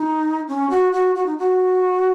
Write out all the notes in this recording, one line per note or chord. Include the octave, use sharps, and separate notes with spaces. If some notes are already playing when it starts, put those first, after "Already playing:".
Already playing: D#4
C#4
F#4
F#4
F#4
D#4
F#4